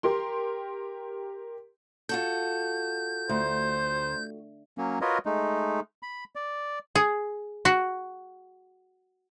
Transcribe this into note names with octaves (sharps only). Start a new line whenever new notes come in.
G4 A#4 C6
F4 F#4 A4 G6
D2 C5
F#3 A#3 C#4
F4 F#4 A#4 B4 C#5 D#5
G#3 A3 D#4
B5
D5
G#4
F#4